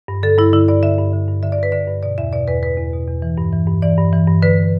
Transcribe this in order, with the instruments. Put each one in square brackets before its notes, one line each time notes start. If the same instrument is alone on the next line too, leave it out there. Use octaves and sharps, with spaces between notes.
[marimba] G2
D3 A4
G2 E4
D3 E4
G2 D5
D3 E5
G2
D3
G2
D3 E5
D5
G2 B4
D3 D5
G2
B2 D5
E2 E5
B2 D5
E2 B4
B2 B4
E2
B2
E2
E3
G2
E3
G2
E3 D5
G2
E3
G2
D3 B4